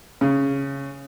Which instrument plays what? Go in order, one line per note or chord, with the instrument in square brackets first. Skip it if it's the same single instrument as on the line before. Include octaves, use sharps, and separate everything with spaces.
[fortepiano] C#3